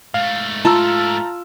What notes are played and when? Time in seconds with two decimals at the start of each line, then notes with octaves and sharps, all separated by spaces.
0.14 G#2 A3 F5
0.65 F4 A5 A#5 E6